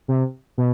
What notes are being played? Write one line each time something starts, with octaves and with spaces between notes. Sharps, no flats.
C3
B2